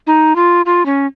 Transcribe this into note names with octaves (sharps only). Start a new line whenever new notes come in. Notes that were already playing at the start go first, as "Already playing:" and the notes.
D#4
F4
F4
C#4